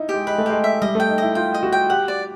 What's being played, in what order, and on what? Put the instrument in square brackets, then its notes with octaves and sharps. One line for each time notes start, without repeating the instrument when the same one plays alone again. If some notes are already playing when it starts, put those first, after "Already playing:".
Already playing: [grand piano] D#4 E4
[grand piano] G#3 [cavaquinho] G4
[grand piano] G#3 [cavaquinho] B4
[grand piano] A3
[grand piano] G#3 [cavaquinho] G4
[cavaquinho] E5
[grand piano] G3 [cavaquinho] D#5
[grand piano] A3 [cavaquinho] G5
[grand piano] D#4
[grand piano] E4 [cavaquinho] D#5
[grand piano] F4 [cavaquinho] G5
[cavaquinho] D#5
[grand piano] F#4
[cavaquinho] G5
[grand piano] G4 [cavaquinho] F#5
[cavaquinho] D5